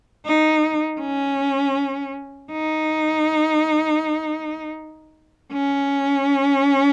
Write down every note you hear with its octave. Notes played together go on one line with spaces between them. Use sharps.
D#4
C#4
D#4
C#4